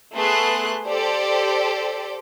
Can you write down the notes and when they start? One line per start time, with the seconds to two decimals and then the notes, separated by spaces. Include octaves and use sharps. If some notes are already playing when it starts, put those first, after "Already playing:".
0.14 A3 B3 G#4 C6 F#6
0.87 G4 A4 C5 D5